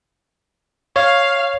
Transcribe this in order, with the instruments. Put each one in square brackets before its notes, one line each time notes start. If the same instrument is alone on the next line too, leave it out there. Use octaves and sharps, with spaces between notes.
[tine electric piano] C#5 [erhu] F5